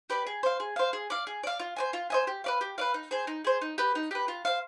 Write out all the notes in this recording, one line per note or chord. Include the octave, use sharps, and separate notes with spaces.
G4 B4 D5
G#4
C5 F5
G#4
C5 F5
G#4
D5 F5
G#4
D5 F5
F4
C5 D#5 G#5
F4
C5 D#5 G#5
G4
B4 D5 F5
G4
B4 D5 F5
D#4
G#4 C5
D#4
G#4 C5
D#4
G4 B4
D#4
G4 B4
F4
C5 F5